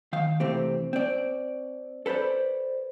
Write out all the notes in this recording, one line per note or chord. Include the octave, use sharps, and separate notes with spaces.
D#3 F5
C3 E3 A3 C4 G4
C4 D5
A4 B4 C5 D5